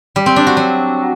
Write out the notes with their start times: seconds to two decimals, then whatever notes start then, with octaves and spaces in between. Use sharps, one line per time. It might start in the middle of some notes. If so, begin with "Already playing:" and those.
0.16 G3
0.26 C4
0.36 D4
0.47 F#4
0.57 F#3